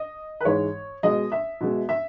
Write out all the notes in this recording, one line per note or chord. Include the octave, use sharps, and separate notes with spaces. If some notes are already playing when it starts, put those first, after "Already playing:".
Already playing: D#5
B4
G#2 E3 G#3 C#5
B2 G#3 D#5
E5
B2 G#3
E5